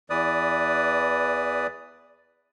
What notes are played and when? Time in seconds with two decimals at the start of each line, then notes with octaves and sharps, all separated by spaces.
0.10 E2 E3 B4 D5 D#6